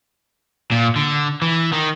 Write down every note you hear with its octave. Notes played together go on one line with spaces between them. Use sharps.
A#2
D3
E3
D#3